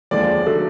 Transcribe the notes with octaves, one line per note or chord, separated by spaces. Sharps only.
D#2 D3 F3 G#3 D5
D3 F#3 A3